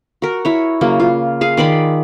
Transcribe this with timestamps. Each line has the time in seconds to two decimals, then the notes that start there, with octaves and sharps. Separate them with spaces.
0.22 F#4 A#4
0.45 E4 C#5
0.81 C#3 F#3 A#3
1.00 F4
1.41 G#4 F5
1.57 D#3 D5 B5 C6